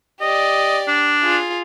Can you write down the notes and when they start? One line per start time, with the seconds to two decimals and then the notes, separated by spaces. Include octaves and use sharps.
0.21 G4 D5 D#5
0.88 D4
1.22 F4 G#4